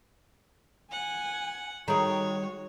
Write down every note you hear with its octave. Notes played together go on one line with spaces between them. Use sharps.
F#5 G#5
D#3 G3 F#4 G#4 A#4 C#5 A#5